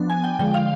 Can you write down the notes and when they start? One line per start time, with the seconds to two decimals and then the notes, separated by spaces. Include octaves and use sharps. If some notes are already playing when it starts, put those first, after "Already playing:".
Already playing: F3 B3 D4
0.10 G#5
0.24 G5
0.39 D3 F3 G#3 G5
0.54 F5